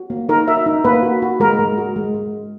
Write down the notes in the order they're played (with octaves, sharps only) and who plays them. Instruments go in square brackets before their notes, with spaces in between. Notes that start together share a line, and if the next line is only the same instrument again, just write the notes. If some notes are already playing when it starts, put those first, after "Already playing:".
Already playing: [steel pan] F#4
A#3
D#4 A#4
F#4 E5
D#4
A#3 B4
F#4
F#4
G#3 A#4
G#3
F#4
G#3
G#3
F#4